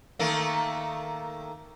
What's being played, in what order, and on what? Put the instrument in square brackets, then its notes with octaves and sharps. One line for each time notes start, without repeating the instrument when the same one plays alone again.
[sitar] D#3 A3 A#3